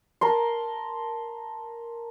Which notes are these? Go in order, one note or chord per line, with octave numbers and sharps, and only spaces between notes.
A#4 A5 C6